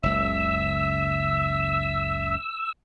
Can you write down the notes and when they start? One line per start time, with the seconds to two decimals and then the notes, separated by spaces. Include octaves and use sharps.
0.03 F#1 C#2 E5 E6